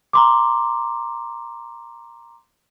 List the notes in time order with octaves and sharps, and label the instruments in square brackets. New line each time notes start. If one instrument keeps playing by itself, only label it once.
[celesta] A#5 C6 D6